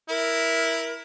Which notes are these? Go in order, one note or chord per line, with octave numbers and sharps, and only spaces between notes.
E4 A#4